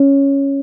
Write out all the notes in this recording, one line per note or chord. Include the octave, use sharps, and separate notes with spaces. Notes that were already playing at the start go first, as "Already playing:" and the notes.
Already playing: C#4